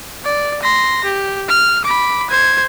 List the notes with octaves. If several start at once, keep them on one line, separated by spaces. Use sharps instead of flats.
D5
C6 A#6
G4
F6
B5 D6
C5 G#6